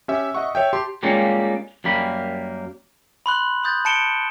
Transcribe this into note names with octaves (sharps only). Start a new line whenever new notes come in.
C#4 G4 E5
D#5 E5 F#5 C#6
C#5 E5 G5
G4 A5 C6
G3 G#3 A#3 C#4 F4
F#2 G3 A#3 B5
B5 C6 F#6 F#7
B5 C6 D#6 G6 A6
A5 B5 C#7 D7 E7 G7